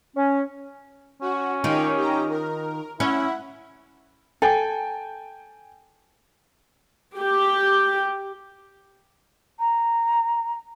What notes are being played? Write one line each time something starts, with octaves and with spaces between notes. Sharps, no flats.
C#4
C#4 F#4
D#3 D#4 F4 G4 C#5
G4 A#5
A#4
C#4 E4 E5 F#5
A4 G5 G#5
G4
A#5